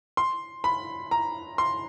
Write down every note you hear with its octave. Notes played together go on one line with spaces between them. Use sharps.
C6
B5
A#5
C6